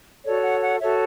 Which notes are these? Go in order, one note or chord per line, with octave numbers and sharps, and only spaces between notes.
F#4 A4 C#5 D5
F#5
F#5
F#4 A4 C#5 E5